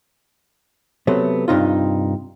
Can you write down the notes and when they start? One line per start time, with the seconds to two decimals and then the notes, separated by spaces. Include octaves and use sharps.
1.07 C3 F#3 A3 B3
1.48 G2 C3 D#4 F4